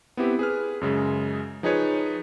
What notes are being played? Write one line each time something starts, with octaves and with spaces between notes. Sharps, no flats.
B3 C4 E4 G4
G#4 B4 F6
F#2 C#3 G#3 G#4
F3 D#4 G#4 B4 C#5